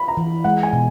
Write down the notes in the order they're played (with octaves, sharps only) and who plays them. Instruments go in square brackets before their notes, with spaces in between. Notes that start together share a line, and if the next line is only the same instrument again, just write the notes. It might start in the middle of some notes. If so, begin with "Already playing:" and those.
Already playing: [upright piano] B5
A#5
[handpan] E3
[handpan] G#3 [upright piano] F#5
[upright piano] G#5
[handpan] B2